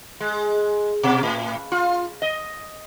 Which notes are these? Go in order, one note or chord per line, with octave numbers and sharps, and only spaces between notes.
G#3
B2
A2
F4
D#5